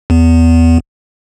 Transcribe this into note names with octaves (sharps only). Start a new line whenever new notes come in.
E2 B3